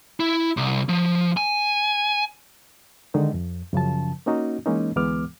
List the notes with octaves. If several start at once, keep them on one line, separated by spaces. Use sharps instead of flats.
E4
C2
F3
G#5
D3 D#3 G#3 D#4
F2
F#2 C#3 F3 A5
A#3 C#4 D#4 F#4
E3 G#3 A#3 C#4 D#4
D2 E3 G#3 B3 D6 F6